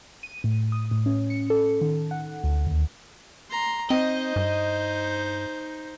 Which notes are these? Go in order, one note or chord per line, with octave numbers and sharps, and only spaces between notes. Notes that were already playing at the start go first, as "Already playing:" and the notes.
D#7
A2
D#6
A2
C#4
C#7
A4
D#3
F#5
D2
D#2
A#5 C6
C4 D#4 C5 D#5
G2